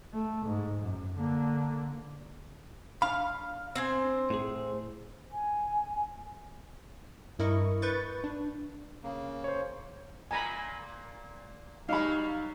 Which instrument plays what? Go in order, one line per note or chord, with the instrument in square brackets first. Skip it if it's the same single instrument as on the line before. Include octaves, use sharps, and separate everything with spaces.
[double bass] A3
G#2
F#2
D3 A#3
[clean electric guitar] D4 B5 [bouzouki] F5
[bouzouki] C4 C5 G#5
[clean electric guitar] A2 G#4
[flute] G#5
[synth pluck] G2 E4 A#4 D#5 C#6
B4 C#6 G6 A6
D4
[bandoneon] C#3 A#3
[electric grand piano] C5 C#5
[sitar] A#2 A#3 [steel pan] G#5 A#5 B5
[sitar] F#3 G3 [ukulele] D#4 B5 [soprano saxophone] F5